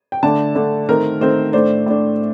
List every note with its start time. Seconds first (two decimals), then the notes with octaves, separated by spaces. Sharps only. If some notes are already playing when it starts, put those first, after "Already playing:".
0.12 G5
0.23 D3 A3 D4 A5
0.55 D3 A3 D4
0.89 D#3 A3 C4 A#4
1.21 D#3 A3 C4 C5
1.53 A2 A3 D4 C5
1.86 A2 A3 D4